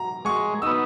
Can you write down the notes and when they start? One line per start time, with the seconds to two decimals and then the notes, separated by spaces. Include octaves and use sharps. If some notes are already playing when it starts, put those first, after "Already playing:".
Already playing: A#5
0.25 G#3 C#6
0.62 B3 D#4 E6